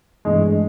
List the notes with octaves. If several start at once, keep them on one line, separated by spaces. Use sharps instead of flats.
G2 E3 G#3 A3 D4